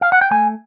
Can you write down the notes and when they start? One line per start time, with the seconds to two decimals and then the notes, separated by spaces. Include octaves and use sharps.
0.01 F5
0.12 F#5
0.21 G5
0.31 A3 G#5